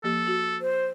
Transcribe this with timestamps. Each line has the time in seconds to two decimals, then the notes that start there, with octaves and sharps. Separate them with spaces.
0.04 F3 A#3 G4 A4
0.27 F#4
0.61 C5